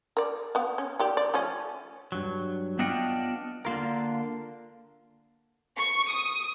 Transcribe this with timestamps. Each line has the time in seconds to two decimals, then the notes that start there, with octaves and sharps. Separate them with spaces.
0.17 A#4 D5
0.55 B3 F5
0.78 C#4
0.99 D#3 G4 D5
1.17 D5
1.34 F3 A3 C#4
2.12 G2 F#3
2.79 B3 D4 F4 D#5 F#5 G5
3.65 D3 A#3 F4 A#4
5.79 C#6
6.11 D#6